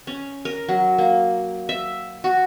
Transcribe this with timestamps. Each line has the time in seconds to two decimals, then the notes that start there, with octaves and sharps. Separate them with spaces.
0.07 C#4
0.45 A#4
0.69 F#3
0.98 A#3
1.69 E5
2.24 F#4